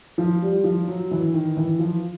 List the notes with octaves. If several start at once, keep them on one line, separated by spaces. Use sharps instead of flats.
F3
G3
F3
F#3
E3
D#3
E3
F3